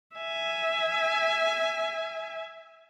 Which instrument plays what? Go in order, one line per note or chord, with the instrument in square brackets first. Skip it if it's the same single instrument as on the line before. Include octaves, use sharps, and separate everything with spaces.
[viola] E5 G#5